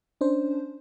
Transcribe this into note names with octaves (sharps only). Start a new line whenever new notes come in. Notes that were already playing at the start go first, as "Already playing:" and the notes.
C#4 D4 C5